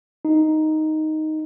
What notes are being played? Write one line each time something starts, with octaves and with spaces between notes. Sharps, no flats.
D#4